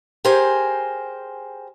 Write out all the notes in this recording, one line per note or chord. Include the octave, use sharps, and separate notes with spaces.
G4 G#4 A#4 C5 G#5